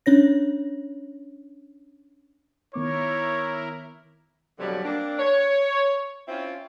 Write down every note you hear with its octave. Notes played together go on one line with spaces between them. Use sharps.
C#4 D4 C#5 A#6
D#3 B3 E4 A#4 C#5 D6
F2 B2 D3 F#3 G3
A#3 C4 D4
C#5
C4 C#4 E4 F4